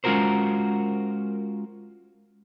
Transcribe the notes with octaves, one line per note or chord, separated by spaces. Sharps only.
G#3 C#4 F4 F#4 A#4 C5